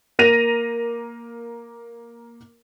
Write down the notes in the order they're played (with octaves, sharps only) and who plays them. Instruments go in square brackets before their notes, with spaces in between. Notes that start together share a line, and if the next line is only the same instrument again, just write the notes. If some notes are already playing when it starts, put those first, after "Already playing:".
[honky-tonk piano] A#3 A#4 A#6 D#7 F7